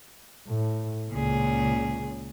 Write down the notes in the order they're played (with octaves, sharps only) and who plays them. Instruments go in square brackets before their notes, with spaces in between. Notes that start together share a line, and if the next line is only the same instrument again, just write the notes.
[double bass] A2
[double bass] C#2 C#3 [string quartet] A#2 G#4